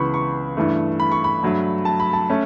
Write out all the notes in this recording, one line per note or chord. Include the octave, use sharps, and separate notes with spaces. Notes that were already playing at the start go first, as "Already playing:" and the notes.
Already playing: C#2 C#3 E3 B3 B5 C#6
C#6
G2 E3 A3
B5
C#6
B5
G2 F#3 A3
A5
B5
A5
A3 C#4